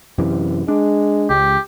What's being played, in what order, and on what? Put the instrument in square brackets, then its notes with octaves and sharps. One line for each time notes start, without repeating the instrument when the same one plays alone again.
[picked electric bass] F#2 C3 E3
[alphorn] G#3 [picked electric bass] D4
[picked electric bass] C#2 [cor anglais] G4